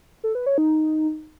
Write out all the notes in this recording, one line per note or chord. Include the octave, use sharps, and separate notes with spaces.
A4
B4
C#5
D#4